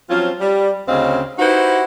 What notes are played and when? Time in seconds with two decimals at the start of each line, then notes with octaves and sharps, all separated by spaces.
0.10 F3 F#3 C4 C#4 F4
0.40 G3
0.88 D2 C#3 C4 C#4 D#5 F5
1.39 D#4 E4 F#4 G4 B4 C5